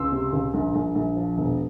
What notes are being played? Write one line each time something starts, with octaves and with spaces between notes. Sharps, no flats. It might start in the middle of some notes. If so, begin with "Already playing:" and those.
Already playing: C#2 C6 E6
C3
C#2
A#1
A#1
A#1
F3
E1